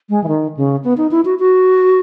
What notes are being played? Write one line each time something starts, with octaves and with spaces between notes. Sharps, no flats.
G#3
E3
D#3
C#3
B3
D#4
E4
F#4
F#4